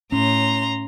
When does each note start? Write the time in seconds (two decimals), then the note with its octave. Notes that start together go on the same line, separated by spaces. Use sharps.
0.12 A2 C#4 A#5 C6